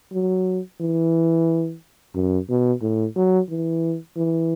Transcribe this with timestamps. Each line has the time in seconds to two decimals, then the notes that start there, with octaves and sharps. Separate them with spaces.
0.13 F#3
0.81 E3
2.15 F#2
2.49 B2
2.82 A2
3.16 F#3
3.50 E3
4.17 E3